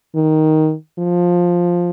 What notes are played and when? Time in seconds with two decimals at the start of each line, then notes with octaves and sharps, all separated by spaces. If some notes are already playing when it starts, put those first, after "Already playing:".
0.15 D#3
0.99 F3